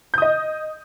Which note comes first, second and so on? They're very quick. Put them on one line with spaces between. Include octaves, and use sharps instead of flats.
G6 D#6 D#5